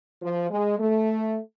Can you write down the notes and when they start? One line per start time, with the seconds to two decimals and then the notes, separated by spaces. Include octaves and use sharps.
0.22 F3
0.51 G#3
0.79 A3